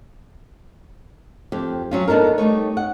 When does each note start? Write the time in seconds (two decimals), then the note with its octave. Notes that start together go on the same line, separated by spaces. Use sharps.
1.52 F2 G4
1.91 F#3 C#4 F4
2.08 B3 D4 D#4 A4 A#4
2.38 G3 A3 D#4 C#5
2.77 F#5